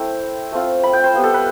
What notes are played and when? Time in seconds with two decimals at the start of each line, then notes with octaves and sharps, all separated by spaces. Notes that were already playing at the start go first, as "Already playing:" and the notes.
Already playing: A3 C4 E4 G5
0.52 A3 C4 F4
0.83 B5
0.93 G5
1.04 C5
1.14 G3 B3 F4
1.23 A4
1.34 B4